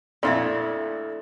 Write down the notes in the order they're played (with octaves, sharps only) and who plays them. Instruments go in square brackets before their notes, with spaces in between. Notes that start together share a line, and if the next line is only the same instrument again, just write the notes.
[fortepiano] F2 A#2 [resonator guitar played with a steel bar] A3 D4 E4 [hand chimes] A4 [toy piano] D5 E5